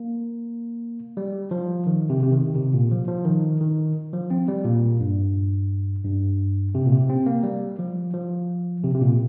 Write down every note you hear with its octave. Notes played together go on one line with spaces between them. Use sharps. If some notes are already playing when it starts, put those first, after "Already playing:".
Already playing: A#3
G3
F3
D#3
C3
C3
D#3
C3
A#2
F3
F3
D#3
D#3
F3
C4
G3
A#2
G2
G2
C3
A#2
C3
C4
A#3
G3
F3
F3
C3
C3
A#2